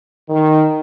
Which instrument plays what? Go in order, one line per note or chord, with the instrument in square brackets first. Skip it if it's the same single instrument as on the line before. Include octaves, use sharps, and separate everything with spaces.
[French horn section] D#3